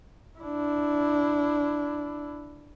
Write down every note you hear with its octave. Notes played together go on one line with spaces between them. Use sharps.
D4 E4